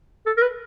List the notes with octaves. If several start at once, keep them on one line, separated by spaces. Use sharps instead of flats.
A4
A#4
B4